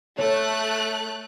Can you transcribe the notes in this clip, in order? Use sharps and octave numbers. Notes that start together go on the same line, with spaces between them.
A3 C#5 F#6